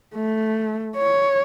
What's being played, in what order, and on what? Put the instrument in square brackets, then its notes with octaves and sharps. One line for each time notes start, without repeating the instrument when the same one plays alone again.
[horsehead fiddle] A3
C#5